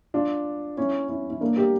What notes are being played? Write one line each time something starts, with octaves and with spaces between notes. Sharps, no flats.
D4 F4
C#4 E4
C#4 E4
E4
A#3 D4
G4 A#4